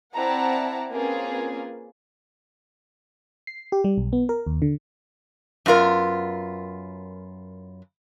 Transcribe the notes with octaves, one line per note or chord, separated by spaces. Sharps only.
C4 E4 D5 F#5 A5 A#5
A#3 C4 C#4 F4 G#4 B4
C7
G4
G3
B1
B3
A#4
D#2
D3
F#2 B3 F4 A#4